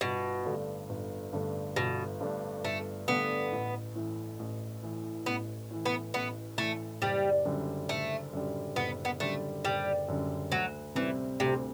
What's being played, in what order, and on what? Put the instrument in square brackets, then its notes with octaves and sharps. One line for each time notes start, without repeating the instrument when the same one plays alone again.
[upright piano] G1 [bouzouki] B2
[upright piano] G2 D3 A3 D4
G1
G2 D3 A3 D4
[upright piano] G1 [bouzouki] B2
[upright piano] G2 D3 A3 D4
[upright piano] G1 [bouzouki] A3
[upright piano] G2 D3 A3 D4 [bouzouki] B3
[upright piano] A1
A2 E3
A1
A2 E3
[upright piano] A1 [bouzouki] B3
[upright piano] A2 E3
[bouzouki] B3
[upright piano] A1 [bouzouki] B3
[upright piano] A2 E3 [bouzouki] A3
[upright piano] F#1 [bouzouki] G3
[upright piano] F#2 D3 G3
[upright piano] F#1 [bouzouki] A3
[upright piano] F#2 D3 G3
[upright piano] F#1 [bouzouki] B3
[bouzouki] B3
[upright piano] F#2 D3 G3 [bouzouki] A3
[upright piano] F#1 [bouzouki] G3
[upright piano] F#2 D3 G3
[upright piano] D2 [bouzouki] F#3
[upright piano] C3 G3 C4 [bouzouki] E3
[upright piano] D2 [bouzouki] C3